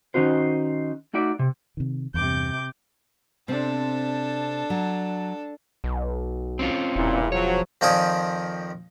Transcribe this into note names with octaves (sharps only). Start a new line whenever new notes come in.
D#3 C#4 D#4 F#4 C5
A3 D#4 F#4 D5 E5
C3
C3 D#3
E2 G2 C3 D6 G6
C3 C4 D4 A4
F#3
B1
C4 C#4 F4
E1 G2 A#2 E4
F3 F#3 C#5
F2 D#3 F3 D5 G#5 D#6